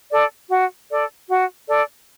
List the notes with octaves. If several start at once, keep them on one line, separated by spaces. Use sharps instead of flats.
A4 D5
F#4
A4 D5
F#4
A4 D5